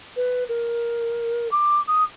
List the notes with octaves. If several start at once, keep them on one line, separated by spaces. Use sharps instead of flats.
B4
A#4
D6
D#6